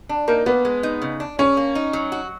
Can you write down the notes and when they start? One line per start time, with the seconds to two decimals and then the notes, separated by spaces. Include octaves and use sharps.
0.09 D4
0.28 A#3 D#4
0.46 A#3 B3
0.65 G#3
0.83 D#4
1.02 C#3
1.20 D4
1.39 C#4 G#4
1.57 A#3
1.75 D#4
1.93 F#3
2.12 F#4